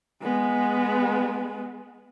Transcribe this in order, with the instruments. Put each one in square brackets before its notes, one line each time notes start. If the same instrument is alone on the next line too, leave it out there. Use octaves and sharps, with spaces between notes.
[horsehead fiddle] G#3 B3